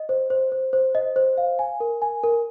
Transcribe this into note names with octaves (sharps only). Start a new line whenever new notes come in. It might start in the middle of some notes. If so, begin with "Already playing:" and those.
Already playing: D#5
C5
C5
C5
C5
D#5
C5
F5
G#5
A#4
G#5
A#4